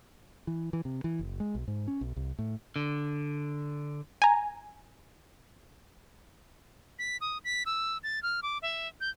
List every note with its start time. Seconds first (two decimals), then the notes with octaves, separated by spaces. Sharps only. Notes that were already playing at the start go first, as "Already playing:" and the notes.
0.47 E3
0.73 E3
0.85 C3
1.04 E3
1.19 F#1
1.40 G#3
1.55 B1
1.68 G#2
1.88 C#4
2.01 B1
2.16 C2
2.39 A2
2.76 D3
4.22 G#5 A#5
6.99 B6
7.21 D#6
7.45 B6
7.66 E6
8.03 A6
8.23 F6
8.43 D6
8.62 E5
9.01 G6